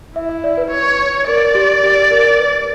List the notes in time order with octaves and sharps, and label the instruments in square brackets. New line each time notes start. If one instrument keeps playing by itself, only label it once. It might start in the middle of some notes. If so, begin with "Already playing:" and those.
[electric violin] E4 [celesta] E5
[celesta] E5
D5
B4
[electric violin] C#5
[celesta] A#4 [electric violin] D5
[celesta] G4
G4
A#4
B4